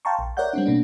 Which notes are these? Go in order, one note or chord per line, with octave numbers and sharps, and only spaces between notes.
F5 G5 A5 A#5 C6 C#6
A#1
A#4 C#5 D5 E5 F#5 G6
G3 C4 D4
B2 A#3 D4